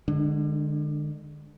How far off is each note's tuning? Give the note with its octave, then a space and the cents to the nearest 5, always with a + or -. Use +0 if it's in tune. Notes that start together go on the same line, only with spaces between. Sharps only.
D3 +30 G#3 +0 D4 +0